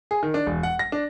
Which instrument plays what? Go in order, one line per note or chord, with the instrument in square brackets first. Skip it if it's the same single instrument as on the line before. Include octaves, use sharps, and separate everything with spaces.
[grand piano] G#4
D#3
D4
E1
F#5
A#6
D4